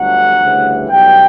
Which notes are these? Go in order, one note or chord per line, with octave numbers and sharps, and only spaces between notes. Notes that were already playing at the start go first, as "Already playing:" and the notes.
Already playing: G1 G2 D3 F#3 A3 F#5
D2 C#3 E3 G3
B1 A2 G3 G5